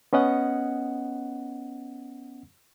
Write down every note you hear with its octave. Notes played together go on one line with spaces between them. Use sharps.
B3 C#4 D#5 F#5